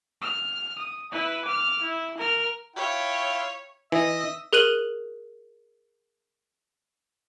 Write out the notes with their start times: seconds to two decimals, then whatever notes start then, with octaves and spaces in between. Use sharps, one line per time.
0.22 F6
0.78 D#6
1.12 E4 B4
1.45 D6 F6
1.82 E4
2.17 A#4 F6
2.76 E4 F4 C#5 G5
3.92 E3 D#5 E5
4.53 G#4 A#4 F#6 D#7 F#7